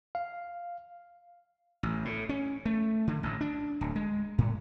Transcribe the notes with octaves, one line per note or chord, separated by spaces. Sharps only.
F5
A1
A2
C#4
A3
D3
A1
D4
D1
G#3
A2